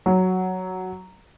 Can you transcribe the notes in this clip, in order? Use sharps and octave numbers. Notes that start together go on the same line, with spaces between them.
F#3